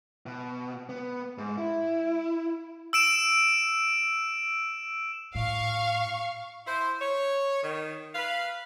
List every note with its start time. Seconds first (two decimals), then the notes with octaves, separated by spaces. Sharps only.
0.26 B2
0.89 B3
1.38 G#2
1.58 E4
2.93 E6 D7 E7
5.35 A2 F5 C#6
6.67 E4 C5
7.00 C#5
7.63 D#3
8.14 B4 F5